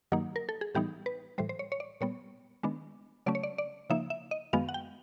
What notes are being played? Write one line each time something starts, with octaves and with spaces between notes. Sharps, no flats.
G2 D#3 F#3 A#3 D#4
A#4
A4
G#4
A2 E3 G3 B3 D#4 G4
B4
A2 E3 G3 C5
C5
C#5
C#5
D5
A#2 G3 B3 C#5
D#3 G#3 B3 D4
C#3 F#3 A3 C#4 D5
C#5
D5
D5
C#3 F3 A#3 D#4 E5
E5
D#5
F#2 D#3 G#3 B3 F5
F#5
G5